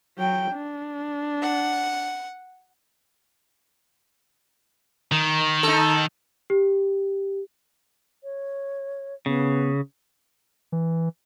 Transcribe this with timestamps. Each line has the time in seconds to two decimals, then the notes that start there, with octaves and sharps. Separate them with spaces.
0.18 F#3 G5
0.52 D4
1.43 F#5
5.12 D#3
5.63 D#4 A4
6.50 G4
8.24 C#5
9.26 C#3 B3
10.72 E3